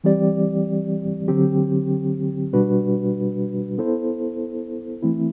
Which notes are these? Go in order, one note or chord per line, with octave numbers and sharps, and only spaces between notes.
E3 G3 C4 G4 D5
D3 F#3 C4 G4
B2 G3 D4 F#4 B4
B3 E4 A4 C5
E3 A3 C4 E4